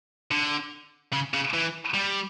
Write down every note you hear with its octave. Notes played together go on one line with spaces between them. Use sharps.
D3
C#3
C#3
E3
G3